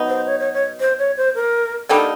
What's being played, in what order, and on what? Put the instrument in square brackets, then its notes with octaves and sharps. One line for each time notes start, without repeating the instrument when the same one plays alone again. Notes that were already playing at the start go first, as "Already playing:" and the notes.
Already playing: [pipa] B2 F#3 B3 D#4
[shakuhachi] C5
C#5
C#5
C#5
C5
C#5
C5
A#4
[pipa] D3 G3 A#3 D#4 [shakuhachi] A4